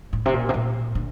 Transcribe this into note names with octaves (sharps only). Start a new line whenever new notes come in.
A2
C3
A#2
C3
A#2
D3